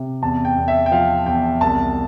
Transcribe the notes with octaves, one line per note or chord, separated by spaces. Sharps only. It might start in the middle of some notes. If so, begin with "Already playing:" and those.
Already playing: C3
E2 A5
G5
E2
E5
G5
F3 F5
E2 G5
C2 A5